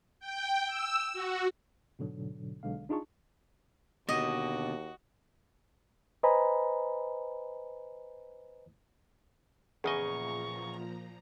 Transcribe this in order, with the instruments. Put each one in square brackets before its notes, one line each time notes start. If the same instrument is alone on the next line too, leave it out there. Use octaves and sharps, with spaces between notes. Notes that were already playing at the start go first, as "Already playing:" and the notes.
[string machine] G5
E6
F#4
[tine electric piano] G#2 B2 D3 F#3
B1 D3 G#3 F5
D4 D#4 F4 G#4 A5 C#6
[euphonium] D#2 [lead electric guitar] B2 D3 [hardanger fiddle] F#4 [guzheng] D#5
[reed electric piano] B4 C5 D#5 G#5 A#5 B5
[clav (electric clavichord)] E2 C#3 D#5 [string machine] A#2 F3 A#5 [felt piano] G#4 [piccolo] C#6